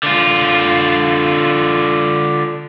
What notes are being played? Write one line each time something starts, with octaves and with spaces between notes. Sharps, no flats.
D3 F4